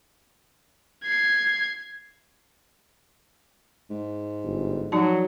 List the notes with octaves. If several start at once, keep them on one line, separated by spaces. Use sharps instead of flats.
G#6 C7
G#2
G1
F3 F#3 D#4 A5